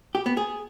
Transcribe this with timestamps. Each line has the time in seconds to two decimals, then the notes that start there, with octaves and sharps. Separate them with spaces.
0.15 G4
0.26 B3
0.37 G#4